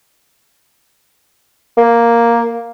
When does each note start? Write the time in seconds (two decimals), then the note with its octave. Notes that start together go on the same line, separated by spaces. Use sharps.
1.77 A#3